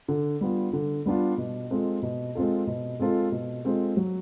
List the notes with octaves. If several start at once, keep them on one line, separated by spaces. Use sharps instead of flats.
D3
G3 B3 D4 F4
D3
G3 B3 D4 F4
B2
G#3 C4 F4 A4
B2
G#3 C4 F4 A4
B2
G#3 C4 F4 A4
B2
G#3 C4 F4 A4
F#3